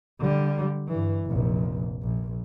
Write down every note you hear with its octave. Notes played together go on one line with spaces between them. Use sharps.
D3 G3
G2 E3
F1 A#1
A#1